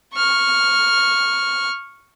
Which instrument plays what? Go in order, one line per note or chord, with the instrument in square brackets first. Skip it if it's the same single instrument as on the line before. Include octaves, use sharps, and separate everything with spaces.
[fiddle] C#6 F6